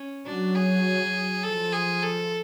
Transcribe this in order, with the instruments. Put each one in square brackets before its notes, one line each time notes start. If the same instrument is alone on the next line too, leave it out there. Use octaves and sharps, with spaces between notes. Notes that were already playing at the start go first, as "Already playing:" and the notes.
Already playing: [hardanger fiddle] C#4
[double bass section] F#3 [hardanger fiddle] D4
[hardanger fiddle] G#4
[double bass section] F3 [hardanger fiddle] A4
[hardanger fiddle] G#4
A4